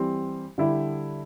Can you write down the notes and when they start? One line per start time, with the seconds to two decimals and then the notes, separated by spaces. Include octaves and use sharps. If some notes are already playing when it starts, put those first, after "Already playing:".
Already playing: E3 G3 C4
0.58 D3 G3 E4 G4